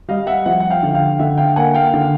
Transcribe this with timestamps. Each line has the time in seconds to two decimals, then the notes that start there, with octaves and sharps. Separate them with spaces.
0.08 G3 D#5 F5
0.27 E5 F#5
0.46 F3 E5 F#5
0.60 F#5
0.70 F5 G5
0.83 D3
0.95 F5 G5
1.19 D3 E5 F#5
1.38 F5 G5
1.56 A#3 F#5 G#5
1.74 F5 G5
1.94 D3